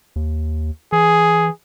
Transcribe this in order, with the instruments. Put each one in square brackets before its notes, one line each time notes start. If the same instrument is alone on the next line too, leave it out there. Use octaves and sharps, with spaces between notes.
[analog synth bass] D#2
[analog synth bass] E3 [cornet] G#4